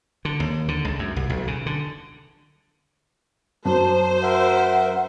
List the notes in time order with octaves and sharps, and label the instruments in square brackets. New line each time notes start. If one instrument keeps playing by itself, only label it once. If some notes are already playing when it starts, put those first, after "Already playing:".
[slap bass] D3
D#2
D3
C#2
F#2
C2
B1
C#3
D3
[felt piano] F#2 [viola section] C5 [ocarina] A5
[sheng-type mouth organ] A#4 E5 [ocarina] F#5